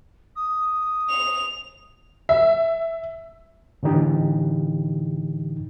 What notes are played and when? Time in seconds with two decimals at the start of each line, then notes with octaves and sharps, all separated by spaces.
0.36 D#6
1.10 F7
2.29 E5
3.83 A2 D3 E3 D#4 G4